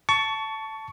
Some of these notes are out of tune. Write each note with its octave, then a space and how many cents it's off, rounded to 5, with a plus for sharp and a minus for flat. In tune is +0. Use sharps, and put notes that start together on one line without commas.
A5 +0 C#6 +20